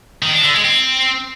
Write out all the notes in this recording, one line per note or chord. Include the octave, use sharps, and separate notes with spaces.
D#3
D4
D3
G#3
C4